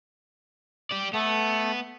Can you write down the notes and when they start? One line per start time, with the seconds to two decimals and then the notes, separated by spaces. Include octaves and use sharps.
0.91 G4 D5
1.14 A3 B3 A4